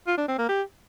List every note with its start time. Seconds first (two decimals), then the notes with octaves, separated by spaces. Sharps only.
0.07 F4
0.18 D4
0.28 C4
0.38 A#3
0.49 G4